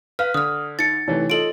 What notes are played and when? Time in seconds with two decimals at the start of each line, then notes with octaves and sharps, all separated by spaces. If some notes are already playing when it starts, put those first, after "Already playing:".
0.19 B4 F5 F6
0.34 D3 D#6 F6
0.79 D#4 A6 C#7
1.08 C3 E3 A3 D#4 C#5
1.30 F4 A4 D#5 D7 F#7